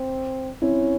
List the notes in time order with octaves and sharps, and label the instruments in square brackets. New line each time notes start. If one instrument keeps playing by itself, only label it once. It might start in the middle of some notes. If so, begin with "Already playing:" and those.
Already playing: [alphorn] C4
[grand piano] C4 E4 [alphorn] C#4